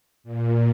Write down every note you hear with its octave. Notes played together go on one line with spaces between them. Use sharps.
A#2